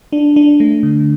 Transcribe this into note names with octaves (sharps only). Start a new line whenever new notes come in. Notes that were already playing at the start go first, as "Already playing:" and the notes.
D4
D4
A3
D3